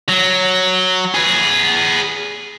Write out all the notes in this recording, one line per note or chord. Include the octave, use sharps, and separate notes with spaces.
F#3
G#4 B4